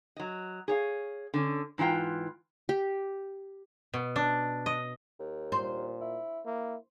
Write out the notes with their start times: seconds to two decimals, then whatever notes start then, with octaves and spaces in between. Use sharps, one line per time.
0.16 F#3 D#5
0.68 G#4 C#5 F5
1.34 D3 C#4
1.78 G#2 E3 D4 F4 G5
2.69 G4
3.94 B2
4.16 D4
4.66 D#5
5.19 D#2
5.52 A#2 C5
6.01 E4
6.46 A#3 E4